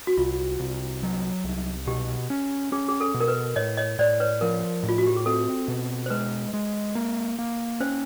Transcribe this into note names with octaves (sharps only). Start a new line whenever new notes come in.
F#4
C2 F4
C2
F#3
C2
B2 G4
C#4
C#4 G#4
G#4
A4
B2
A#4
B4
A2 C#5 D#5
C#5 D#5
A2 C5 D5
B4 C#5
F3 A#4
A2
F4
F#4
G4
G#4
C4 A4
B2
C5
G#3 B4
G#3
A#3
A#3
C#4 C5